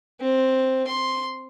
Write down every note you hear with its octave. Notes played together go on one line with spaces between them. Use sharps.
C4
C6